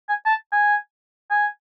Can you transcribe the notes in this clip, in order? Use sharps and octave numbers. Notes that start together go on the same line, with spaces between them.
G#5
A5
G#5
G#5